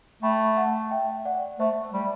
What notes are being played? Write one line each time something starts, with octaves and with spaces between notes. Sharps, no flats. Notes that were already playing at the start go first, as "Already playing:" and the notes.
A3 G5 B5
F#5 A5
E5 G5
D5 F#5
A3 C5 E5
G3